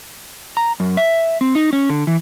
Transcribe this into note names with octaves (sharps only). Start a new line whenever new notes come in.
A#5
F#2
E5
C4
D#4
C#4
D3
E3